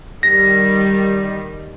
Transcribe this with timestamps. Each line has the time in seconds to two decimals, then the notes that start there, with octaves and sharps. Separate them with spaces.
0.23 D#3 G3 A#6